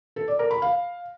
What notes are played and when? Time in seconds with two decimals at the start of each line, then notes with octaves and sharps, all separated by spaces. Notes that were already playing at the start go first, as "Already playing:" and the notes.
0.16 A4
0.28 D5
0.39 A#4
0.51 B5
0.62 F5